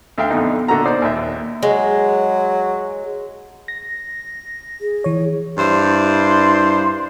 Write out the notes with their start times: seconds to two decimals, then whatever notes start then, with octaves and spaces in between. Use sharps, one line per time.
0.18 D2 E5 F5 G5
0.30 F2 B2 D3 D#4
0.68 A#2 D3 F#4 A4 A#5
0.85 D#4 C5 D5 D6
1.02 D#2 A#2 E5
1.63 F#3 G#3
3.68 A#6
4.81 G#4
5.04 E3 C#5
5.58 G2 E4 C5 D5 C6